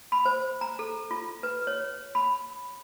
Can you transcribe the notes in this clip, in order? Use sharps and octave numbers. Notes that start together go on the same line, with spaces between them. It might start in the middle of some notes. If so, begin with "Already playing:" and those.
B5
C5
A#5
A4
F4
B4
C#5
B5